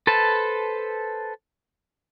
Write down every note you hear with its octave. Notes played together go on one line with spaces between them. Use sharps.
A4 B4 C5 A5